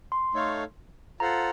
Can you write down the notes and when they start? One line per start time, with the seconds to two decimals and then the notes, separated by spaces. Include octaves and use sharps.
0.12 C6
0.34 A3 D#4 A4 C#5 F5
1.20 F4 A4 C5 F#5 A#5